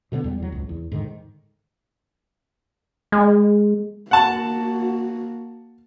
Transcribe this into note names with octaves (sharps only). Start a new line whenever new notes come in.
B2 D3 G3 B3
E2 G3
E2 F#3
G#1 C#2
E2
G#2 D3 D#3
G#3
A#3 F#4 F#5 A5